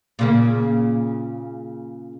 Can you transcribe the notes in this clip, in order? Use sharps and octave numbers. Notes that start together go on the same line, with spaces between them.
A#2 C#3 A#3